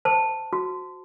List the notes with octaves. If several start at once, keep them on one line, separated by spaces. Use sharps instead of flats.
C5 A5
F#4